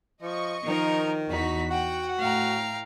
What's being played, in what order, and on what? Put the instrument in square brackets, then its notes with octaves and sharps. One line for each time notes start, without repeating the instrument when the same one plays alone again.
[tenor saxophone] F3 [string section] D#5 C#6
[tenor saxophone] D#3 [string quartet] F3 D#4 A#4
[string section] E2 F#4 B6 [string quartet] D#4
[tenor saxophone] F#4 [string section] F#5 [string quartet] G5
[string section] A2 [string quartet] F5 G5 A#5